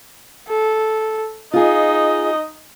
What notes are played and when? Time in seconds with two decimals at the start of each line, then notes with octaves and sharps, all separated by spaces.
0.48 A4
1.53 D#4 F4 G#4 D#5